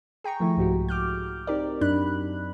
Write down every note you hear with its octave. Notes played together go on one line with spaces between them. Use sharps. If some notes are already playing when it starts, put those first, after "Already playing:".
G#4 G5 A#5 C#6
D#3 F3 A3 E4
C2 G#2 F#4 G4
D6 F6 G6
C4 D#4 G4 A#4 D5
F#2 F#3 D4 D#4 B5 F#6